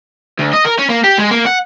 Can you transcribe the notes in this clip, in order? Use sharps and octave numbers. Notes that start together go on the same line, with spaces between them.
D2
D#5
A#4
C#4
A#3
G4
G#3
A#3
F#5